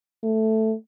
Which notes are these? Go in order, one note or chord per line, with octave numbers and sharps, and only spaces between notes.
A3